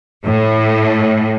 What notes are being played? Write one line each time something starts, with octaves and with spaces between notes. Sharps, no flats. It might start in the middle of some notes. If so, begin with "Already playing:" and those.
A2